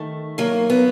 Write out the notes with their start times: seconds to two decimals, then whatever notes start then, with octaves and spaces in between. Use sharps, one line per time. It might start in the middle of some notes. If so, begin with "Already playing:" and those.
Already playing: D#3 A3
0.38 F#3 A#3
0.70 B3